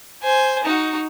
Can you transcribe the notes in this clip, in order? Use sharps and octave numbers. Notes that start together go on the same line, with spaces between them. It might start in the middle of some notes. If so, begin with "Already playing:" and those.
C5 G#5
D#4 F#4